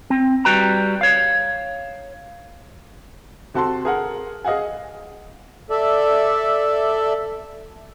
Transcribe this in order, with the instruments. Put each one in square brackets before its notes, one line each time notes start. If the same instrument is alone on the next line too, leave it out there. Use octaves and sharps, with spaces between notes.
[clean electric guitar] C4
G3 F#4 B4 G5 A#5
C#5 F5
[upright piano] C3 F#4 A4 A5 C6
G#4 A#4 F#5
G#4 D#5 F5 F#5 G#5
[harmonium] A4 D5 E5